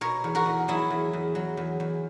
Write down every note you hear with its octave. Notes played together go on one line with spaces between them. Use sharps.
B2 A#4 C#5
E2
F#4 A#4
E2
F#3 E4 G#4
E2
E2
F#3
E2
E2